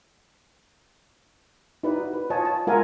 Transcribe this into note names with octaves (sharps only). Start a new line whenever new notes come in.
D#4 E4 G4 B4 D5
F#4
B4
F4 C#5 D#5 G#5 A5
A5
G#3 F4 A#4 E5 F#5 G#5